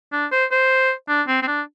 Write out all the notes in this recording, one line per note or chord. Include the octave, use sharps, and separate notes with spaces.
D4
C5
C5
D4
C4
C4
D4